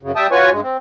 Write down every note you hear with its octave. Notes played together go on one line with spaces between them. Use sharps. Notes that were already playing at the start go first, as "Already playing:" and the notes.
F#2 C#3
G3 E5 G5 A5 D#6
F4 F#4 B4 C#5 G#5 C#6
G2 G#3
C4